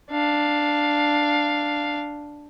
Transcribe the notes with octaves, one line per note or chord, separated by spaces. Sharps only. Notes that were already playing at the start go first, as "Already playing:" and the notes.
D4 F5